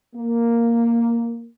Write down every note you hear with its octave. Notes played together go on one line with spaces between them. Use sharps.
A#3